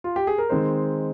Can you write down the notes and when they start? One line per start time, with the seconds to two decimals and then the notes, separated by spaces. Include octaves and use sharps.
0.04 F4
0.16 G4
0.27 G#4
0.38 A#4
0.49 D#3 G#3 C4 D#4 C5